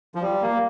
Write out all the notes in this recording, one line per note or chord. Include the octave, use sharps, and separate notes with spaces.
F3
G3
A#3